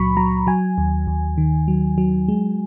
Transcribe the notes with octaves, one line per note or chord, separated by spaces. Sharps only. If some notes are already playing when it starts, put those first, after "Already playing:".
Already playing: C#2 A#2 F#3 B5 C#6
F#3 A#5
F#3 G#5
D#2
D#2
D#3
F#3
F#3
G#3